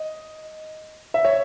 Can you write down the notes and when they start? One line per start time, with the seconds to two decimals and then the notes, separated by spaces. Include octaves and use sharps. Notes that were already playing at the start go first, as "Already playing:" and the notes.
Already playing: D#5
1.14 E5
1.25 C#5